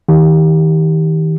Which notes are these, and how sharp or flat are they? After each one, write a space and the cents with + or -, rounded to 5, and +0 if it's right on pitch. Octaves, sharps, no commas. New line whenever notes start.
D#3 +35 G4 +0